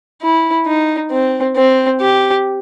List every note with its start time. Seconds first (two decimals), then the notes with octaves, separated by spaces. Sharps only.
0.22 E4
0.66 D#4
1.11 C4
1.56 C4
2.01 G4